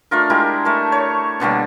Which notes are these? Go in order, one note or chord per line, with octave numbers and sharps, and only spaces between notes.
A3 D4 F4 A#4
G#3 E4 G4 A#4
A3 A#4 A5
C#5
B2 D3 G3 A#3